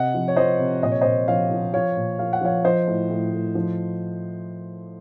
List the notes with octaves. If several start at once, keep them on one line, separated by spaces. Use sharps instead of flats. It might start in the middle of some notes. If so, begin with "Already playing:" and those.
Already playing: C3 D#5 F#5
F3
C#5
F3 C5 D#5
C3
A#2 D#5
C#5
A#2 C5 D#5
F3 C#5 F5
F3
F3 C#5 F5
A#2
F3 F5
F#5
F3 C#5 F5
F3 C5 D#5
A2
A2
A2
F3